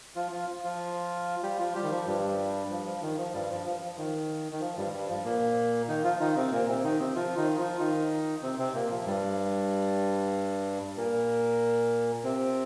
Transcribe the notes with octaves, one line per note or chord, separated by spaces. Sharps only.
F3 F4
F3 F4
F3 F4
G3 G4
F3 F4
G3 G4
D#3
F3
G2 G3
F3
F3
D#3
F3
G2 G3
F3
F3
F3
D#3
D#3
F3
G2 G3
G2 G3
F3
A#2 A#3
D#3 D#4
F3 F4
D#3 D#4
C3 C4
A#2 A#3
C3 C4
D#3 D#4
C3 C4
F3 F4
D#3 D#4
F3 F4
D#3 D#4
C3 C4
C3 C4
A#2 A#3
F3
G2 G3
A#2 A#3
C3 C4